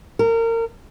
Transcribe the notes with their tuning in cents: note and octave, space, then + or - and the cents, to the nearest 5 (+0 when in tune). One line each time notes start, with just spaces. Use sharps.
A#4 -30